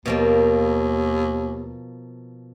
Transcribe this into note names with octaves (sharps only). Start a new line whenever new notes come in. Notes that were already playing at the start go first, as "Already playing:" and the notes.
D#2 B2 F3 A#3